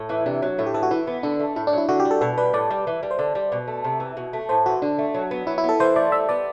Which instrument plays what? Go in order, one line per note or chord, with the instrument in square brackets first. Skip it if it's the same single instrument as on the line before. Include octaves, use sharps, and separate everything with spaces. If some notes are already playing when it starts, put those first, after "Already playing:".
Already playing: [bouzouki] A2
E3
[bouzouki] C3 [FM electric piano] D4
[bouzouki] F#3
[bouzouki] A2 [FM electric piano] E4
[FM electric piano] G4
[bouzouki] E3 [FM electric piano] A4
[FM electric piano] F#4
[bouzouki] E3 [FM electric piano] E4
[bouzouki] B3
[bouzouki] D3 [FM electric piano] D4
[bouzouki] A3
[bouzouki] A2 [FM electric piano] E4
[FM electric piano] D4
[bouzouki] F#3 [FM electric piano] E4
[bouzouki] D3 [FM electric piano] F#4
[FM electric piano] G4
[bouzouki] G3
[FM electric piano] A4
[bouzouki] B2 [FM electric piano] A4
[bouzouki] G3 [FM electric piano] B4
[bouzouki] A2 [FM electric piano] D5
[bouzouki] G3
E3
G3
[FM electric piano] C5
[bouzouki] D3 [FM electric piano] D5
[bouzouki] G3
B2
A3
C3
E3
B2
A3
[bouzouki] A2 [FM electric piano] C5
[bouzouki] E3 [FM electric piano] F#4
[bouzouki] D3 [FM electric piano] D4
[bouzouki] A3
F#3
B3
[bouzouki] F#3 [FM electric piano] E4
[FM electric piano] E4
[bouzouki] B3
[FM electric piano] A4
[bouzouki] E3 [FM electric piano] C5
[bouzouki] A3 [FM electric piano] D5
[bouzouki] G3 [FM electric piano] E5
[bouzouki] B3 [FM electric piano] D5